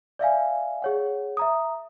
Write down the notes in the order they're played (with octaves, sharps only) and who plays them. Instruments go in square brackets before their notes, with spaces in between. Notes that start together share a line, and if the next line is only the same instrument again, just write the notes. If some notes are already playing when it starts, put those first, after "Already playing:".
[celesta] D5 E5 F5 G#5
G#4 C#5 F#5
E5 A#5 D#6